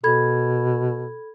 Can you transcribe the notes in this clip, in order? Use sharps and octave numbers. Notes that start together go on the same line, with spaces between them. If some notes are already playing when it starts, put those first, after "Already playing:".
B2 A4 B5 G#6